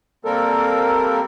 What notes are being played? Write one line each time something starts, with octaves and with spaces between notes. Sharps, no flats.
C3 G3 A#3 C4 A4 A#4